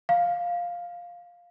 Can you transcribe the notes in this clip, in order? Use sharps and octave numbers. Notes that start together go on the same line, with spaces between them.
F5